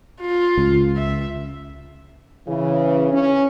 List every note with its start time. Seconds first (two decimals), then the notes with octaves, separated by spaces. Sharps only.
0.21 F4
0.58 C#2
0.96 E5
2.48 C#3 E3
3.14 C#4